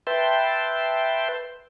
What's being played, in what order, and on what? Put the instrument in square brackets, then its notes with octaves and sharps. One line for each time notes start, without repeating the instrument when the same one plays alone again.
[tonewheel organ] B4 E5 G5 A5 C6